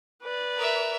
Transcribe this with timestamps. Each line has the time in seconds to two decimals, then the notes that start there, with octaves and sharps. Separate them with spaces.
0.23 B4 D5
0.56 A#4 E5